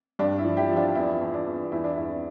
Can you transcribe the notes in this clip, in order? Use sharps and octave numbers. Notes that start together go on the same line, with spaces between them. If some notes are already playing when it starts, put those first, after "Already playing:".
G2 D4
E4
F3
E4 G4
F3
D4 F4
E2 E4
E2
D4
E2
E2 E4
D4
E2 E4